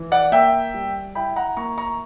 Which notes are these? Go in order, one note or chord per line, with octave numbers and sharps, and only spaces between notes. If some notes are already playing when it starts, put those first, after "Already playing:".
Already playing: E3
D5 F#5
A#3 E5 G5
G3
E4 G5 B5
F#5 A#5
A#3 A#5 C#6
A#5 C#6